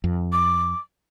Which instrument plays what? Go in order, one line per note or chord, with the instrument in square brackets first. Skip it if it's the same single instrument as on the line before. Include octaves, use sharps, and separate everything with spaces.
[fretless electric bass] F2
[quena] D6